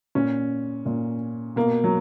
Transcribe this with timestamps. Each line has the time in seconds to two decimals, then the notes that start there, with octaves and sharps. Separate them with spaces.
0.15 A#2 C#4
0.86 A#2
1.56 B2 A#3
1.84 F#3